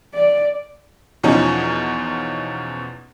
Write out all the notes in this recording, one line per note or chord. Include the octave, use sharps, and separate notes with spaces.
D5
E2 B2 F3 C#4 D#4